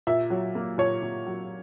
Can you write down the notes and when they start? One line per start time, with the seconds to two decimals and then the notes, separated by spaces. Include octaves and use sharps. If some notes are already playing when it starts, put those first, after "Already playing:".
0.07 A#2 E5
0.30 F#3
0.55 A#3
0.78 A#2 C#5
1.03 A#2
1.27 F#3